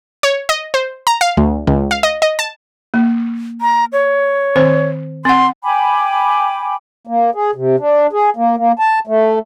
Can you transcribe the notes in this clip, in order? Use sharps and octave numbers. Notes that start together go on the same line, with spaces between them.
C#5
D#5
C5
A#5
F5
D2
C#2
F5
D#5
D#5
A5
A#3
A#5
C#5
D#3 C4 C5
C4 F#5 C6
G5 G#5 B5 D6
A#3
G#4
C3
D4
G#4
A#3
A#3
A5
A3